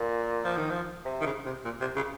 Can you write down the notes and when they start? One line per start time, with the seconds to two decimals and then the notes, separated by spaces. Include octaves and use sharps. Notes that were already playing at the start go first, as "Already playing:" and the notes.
Already playing: A#2
0.44 F3
0.57 D#3
0.70 F3
1.05 C3
1.21 D#3
1.25 C#3
1.45 C3
1.65 A#2
1.80 C3
1.96 C#3